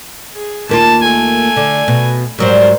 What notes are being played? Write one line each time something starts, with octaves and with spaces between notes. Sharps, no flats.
G#4
D#2 A#3 F4 A5
A3 G#5
D3
B2
G#2 F#3 G3 A#4 C5